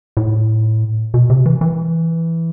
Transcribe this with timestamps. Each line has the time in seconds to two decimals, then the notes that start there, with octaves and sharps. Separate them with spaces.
0.17 A2
1.14 B2
1.30 C3
1.46 E3
1.61 E3